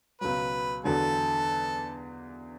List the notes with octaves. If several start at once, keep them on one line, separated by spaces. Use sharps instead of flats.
C#2 B2 F#3 B4
E2 D3 F#3 A4